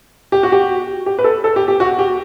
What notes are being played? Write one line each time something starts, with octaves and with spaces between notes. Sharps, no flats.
G4
F#4
G4
G4
B4
A4
A4
G4
G4
F#4
G4